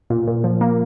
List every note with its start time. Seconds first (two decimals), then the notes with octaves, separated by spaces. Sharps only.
0.10 A#2
0.27 A#2
0.44 F3
0.61 A#3